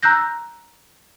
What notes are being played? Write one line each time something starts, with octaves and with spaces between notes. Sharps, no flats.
A#5 E6 F#6 G6 A#6